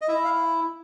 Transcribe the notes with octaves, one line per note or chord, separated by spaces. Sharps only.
D#5
E4 E5
F5